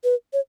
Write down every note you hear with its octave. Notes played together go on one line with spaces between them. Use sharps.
B4
C#5